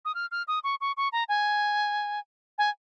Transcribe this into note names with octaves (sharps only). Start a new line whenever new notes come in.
D#6
F6
F6
D#6
C#6
C#6
C#6
A#5
G#5
G#5